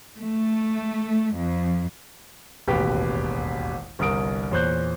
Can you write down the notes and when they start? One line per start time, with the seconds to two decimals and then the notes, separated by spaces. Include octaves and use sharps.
0.18 A3
1.35 F2
2.67 E1 A1 D#2 B2 G4 B4
3.99 G1 C2 A#4 D#6 D7
4.51 E2 A#2 C5 C#5 F#6 G6